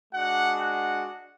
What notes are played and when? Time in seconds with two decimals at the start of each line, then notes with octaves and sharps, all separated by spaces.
0.13 G#3 D4 F#4 F#5
0.61 F#5